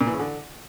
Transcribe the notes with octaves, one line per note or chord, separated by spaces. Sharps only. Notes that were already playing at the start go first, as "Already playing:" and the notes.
A#2
E3
C#3
D3